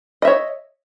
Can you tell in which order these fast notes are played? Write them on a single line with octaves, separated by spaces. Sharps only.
D#5 E5 C#5